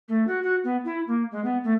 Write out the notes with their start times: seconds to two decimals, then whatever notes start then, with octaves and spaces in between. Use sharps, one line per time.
0.09 A3
0.27 F#4
0.43 F#4
0.64 B3
0.85 E4
1.07 A#3
1.31 G#3
1.44 B3
1.64 A3